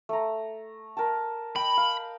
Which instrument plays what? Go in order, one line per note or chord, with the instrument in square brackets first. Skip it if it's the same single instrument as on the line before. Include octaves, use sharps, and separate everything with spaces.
[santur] A3 A#5
A#4 G5 A5
[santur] D#5 G5 [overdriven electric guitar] B5
[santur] F5